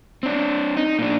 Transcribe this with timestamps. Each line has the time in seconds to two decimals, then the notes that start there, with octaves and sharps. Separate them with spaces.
0.23 C4 D4
0.77 D#4
0.99 A#2 D4